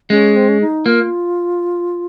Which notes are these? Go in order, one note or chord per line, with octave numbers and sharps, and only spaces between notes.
G#3 C#4
C4
C#4
D#4
A#3 F4